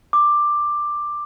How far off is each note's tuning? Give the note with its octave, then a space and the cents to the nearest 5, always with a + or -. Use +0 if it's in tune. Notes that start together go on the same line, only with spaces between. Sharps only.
D6 +10